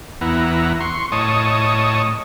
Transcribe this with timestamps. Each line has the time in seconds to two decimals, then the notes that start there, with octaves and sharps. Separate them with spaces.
0.21 E2 B3 E4 F#5 A#5
0.80 C6 C#6
1.12 A2 C#5 D#5 A5 C#6 D#6